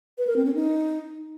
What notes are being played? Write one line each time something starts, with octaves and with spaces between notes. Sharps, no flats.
B4
A#4
C4
C#4
D#4